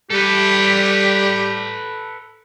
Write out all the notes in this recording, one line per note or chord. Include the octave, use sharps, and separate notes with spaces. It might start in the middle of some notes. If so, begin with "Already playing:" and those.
G3 G4 A4 B4